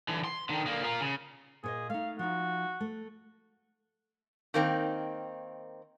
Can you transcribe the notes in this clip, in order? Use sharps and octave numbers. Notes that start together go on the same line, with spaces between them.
D3 E3
C6
D3 D#3
D3 A#3
F4 A#4
C#3
A#2 G#4 C#5 D#5
A3 D#4 F5
F3 D#4 F#4
A3
D#3 A#3 C4 D#4